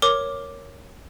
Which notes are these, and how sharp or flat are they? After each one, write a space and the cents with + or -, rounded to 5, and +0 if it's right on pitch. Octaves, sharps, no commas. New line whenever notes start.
A#4 +0 C#5 +0 D6 +0